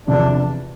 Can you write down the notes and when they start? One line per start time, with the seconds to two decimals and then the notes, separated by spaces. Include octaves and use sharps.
0.07 E2 C3 F3 D4